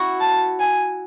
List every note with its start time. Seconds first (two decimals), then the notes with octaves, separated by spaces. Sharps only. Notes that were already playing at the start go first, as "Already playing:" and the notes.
Already playing: E4 F#4
0.20 A5
0.60 G#5